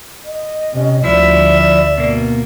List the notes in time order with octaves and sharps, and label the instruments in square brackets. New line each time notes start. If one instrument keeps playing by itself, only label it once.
[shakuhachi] D#5
[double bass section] C3 C#4
[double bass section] D2 G3 [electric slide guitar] F3 E4 [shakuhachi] D5 [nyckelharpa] E5
[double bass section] G2 [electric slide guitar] B2 A#3